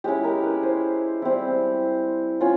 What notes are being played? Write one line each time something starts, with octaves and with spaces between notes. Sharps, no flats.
G#3 C#4 E4 G4
A#4
B4
C5
G3 C4 E4
C#4 F4